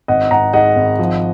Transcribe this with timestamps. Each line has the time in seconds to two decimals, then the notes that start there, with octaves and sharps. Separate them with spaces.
0.08 G#1 D#5 F#5
0.31 G#1 F#5 A#5
0.54 G#2 D#5 F#5
0.76 G#1
0.99 F3